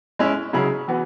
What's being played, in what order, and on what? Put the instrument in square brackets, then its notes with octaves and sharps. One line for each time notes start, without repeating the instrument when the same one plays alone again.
[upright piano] G#3 C#4 E4
C#3 F#3 C#4 E4 G#4
E3 B3 F#4 B4